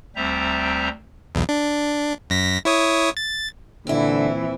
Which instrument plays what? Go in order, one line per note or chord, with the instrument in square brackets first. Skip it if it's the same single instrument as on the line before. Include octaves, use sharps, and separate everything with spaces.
[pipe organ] D2 G3 C4 C5 E5 A#5
[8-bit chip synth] B1 E2
D4
F#2 A#6 B6
E4 C#5 D#6
A6
[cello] A#2 E3 [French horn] D3 [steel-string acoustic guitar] C4 E4